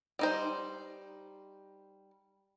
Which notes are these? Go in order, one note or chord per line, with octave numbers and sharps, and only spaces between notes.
G3 D#4 C5